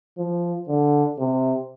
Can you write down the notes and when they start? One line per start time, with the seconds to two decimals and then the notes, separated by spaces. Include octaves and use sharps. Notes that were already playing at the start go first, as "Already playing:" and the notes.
0.18 F3
0.68 D3
1.19 C3